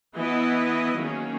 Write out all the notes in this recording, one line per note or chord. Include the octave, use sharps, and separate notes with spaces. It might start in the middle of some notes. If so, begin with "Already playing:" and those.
E3 B3 E4 B4 D#5
D#3 F#3 A#3 C#4 G#4